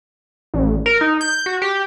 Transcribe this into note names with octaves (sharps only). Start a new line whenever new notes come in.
A1
A#4
D#4
G6
F#4
G4